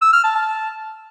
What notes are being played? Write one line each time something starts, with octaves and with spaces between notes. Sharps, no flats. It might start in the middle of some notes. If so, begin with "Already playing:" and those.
E6
F6
A5
A5